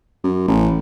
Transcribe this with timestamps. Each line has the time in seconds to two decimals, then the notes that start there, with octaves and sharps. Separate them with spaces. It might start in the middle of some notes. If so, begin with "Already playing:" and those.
0.24 F#2
0.48 A1